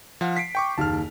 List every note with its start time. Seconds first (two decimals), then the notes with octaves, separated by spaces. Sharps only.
0.21 F3 F5 F#5
0.37 B6 C7 D7
0.55 G5 C#6 D6
0.78 F#1 D#2 A5 F6